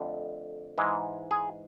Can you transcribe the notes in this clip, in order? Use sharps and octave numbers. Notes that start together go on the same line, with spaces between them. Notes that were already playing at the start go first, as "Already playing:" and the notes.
Already playing: F2 D3 A3
G#2 E3 G#3
G#4